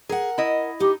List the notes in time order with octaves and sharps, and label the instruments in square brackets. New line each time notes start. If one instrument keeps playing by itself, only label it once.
[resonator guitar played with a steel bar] G#4 [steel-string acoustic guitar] A#4 F#5
[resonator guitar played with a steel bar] E4 D#5
[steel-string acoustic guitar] D#4 [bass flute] G4